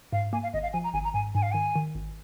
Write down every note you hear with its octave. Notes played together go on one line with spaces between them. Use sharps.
G#2 F5
A#3 G#5
F5
G#1 D#5
F5
F3 G#5
A#5
G#1 G#5
A#5
G#2 G#5
G#2 G#5
F5
D#3 G#5
D#3
G#1